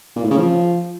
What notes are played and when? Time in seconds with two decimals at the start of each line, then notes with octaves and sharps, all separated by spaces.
0.16 A#2
0.23 A2
0.30 C#3
0.38 F3